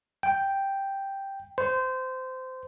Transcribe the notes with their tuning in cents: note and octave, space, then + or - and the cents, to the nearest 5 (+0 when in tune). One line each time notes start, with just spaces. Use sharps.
G5 +0
C5 -20